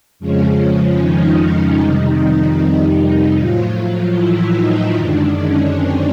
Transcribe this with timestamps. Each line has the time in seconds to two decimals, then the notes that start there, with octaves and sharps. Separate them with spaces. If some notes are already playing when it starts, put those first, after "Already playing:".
0.19 F2 C#3 F3 G#3 C#4
0.98 D#3 D#4
1.77 F2 C3 D#3 G3
3.37 A2 F3 F#3 F4
3.75 F3 F4
4.15 E3 E4
4.55 D#3 D#4
4.94 F#2 D3 D#3 G#3 D4
5.35 C#4
5.74 C4